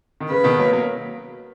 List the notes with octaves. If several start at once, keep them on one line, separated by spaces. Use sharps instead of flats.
D#3
C#3 B4
B2 D#3
F#3 A#3
F#3 A#3